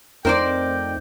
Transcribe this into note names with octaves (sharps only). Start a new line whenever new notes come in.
F2 A3 C4 D#4 A#4 C5 D5 G5